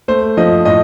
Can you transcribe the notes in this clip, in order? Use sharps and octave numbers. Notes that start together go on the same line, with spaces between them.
A3 C5
F3 D#5
A2 D#5